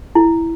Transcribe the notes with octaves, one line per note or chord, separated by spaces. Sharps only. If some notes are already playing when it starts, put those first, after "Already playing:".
E4